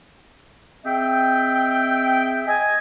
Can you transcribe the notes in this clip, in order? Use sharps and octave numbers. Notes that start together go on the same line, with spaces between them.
C4 G#4 D#5 E5 G5
D#5 G#5